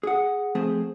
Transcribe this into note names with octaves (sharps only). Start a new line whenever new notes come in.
G#4 F#5
F3 A3 C4 G#4 C5